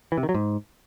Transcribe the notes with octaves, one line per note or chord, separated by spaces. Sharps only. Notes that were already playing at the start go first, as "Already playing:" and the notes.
E3
C3
D#3
F#3
G#2